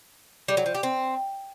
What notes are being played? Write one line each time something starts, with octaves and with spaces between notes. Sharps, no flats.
G3
F#3
F3
G4
C4